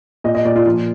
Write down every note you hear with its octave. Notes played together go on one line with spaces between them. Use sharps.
A#2 D#5
D#5
A#2 D5
F4
F3 F4